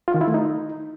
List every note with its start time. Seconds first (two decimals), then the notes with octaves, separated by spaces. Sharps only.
0.08 F4
0.14 D#3
0.21 E4
0.28 A3
0.34 D#4